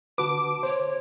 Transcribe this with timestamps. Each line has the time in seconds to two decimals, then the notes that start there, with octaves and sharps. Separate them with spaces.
0.18 D3 F#4 B4 A5 D6
0.63 C5 C#5